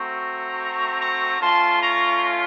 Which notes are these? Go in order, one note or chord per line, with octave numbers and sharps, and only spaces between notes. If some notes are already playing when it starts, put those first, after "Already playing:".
Already playing: A3 C4 F#4 A#5 C#6
A#5 C#6
A3 C#4 F4 A5 C6
A#5 C#6